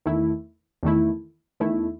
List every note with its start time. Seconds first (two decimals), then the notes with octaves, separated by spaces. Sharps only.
0.06 E2 D#3 A3 E4
0.83 E2 D#3 A3 E4
1.60 E2 D#3 A3 E4